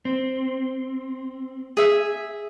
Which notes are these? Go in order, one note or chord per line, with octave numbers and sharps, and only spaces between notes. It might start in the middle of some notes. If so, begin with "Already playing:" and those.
C4
G#4 E5